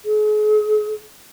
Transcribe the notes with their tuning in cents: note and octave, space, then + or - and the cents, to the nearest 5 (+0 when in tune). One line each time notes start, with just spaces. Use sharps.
G#4 +40